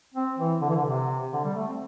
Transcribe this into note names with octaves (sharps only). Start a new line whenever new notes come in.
C4
E3
D3
E3
D3
C3
D3
G3
A3
C4